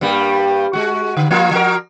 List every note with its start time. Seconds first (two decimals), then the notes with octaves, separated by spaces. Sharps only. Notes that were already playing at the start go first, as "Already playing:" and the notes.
0.01 G2 G3 A#3
0.73 G#3 F#4
1.17 D3
1.31 F3 A#3 F4
1.51 F3 F#4 A#4